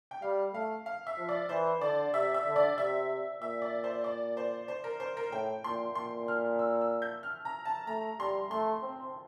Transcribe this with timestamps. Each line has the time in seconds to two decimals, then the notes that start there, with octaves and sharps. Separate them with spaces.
0.11 G5
0.22 G3 F5
0.54 A3 F5
0.86 F5
1.07 E5
1.18 F3
1.29 D5
1.49 E3 C5
1.81 D3 D5
2.13 C3 E5
2.34 E5
2.45 D3
2.56 D5
2.77 C3 E5
3.41 A#2 E5
3.62 D5
3.84 C5
4.04 D5
4.37 C5
4.68 C5
4.84 A#4
5.00 C5
5.17 A#4
5.32 A2 G5
5.64 A#2 C6
5.95 A#2 C6
6.28 F6
6.59 E6
6.81 E6
7.02 G6
7.23 F6
7.45 A#5
7.65 A5
7.87 A3 A#5
8.19 G3 C6
8.51 A3 C6
8.82 C4